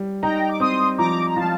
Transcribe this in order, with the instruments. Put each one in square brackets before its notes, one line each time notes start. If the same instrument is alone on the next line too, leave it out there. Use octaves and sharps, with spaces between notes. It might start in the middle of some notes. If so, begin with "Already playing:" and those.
Already playing: [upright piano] G3
[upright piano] D#4 [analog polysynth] G5 A#5
[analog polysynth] D6
[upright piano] C4 [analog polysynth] C6 D#6
[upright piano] F3 [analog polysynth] A#5 D6
[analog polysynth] A#5
[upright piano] F3 [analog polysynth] F5 A5